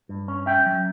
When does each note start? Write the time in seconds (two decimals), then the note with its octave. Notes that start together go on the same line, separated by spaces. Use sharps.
0.09 G2
0.28 C#4
0.46 C#4 E5 G5
0.66 F#3